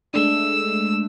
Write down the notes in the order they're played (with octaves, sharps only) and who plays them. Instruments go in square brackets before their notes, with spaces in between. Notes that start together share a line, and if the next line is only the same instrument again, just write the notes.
[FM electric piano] G#3 A3 D4 [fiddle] E6